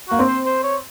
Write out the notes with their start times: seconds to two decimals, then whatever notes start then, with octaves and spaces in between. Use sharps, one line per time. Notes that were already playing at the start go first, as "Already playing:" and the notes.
0.09 A#3 F#4
0.19 C4
0.28 C5
0.46 C5
0.63 C#5